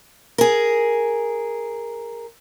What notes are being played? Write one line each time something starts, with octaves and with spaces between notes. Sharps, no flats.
G#4 A#4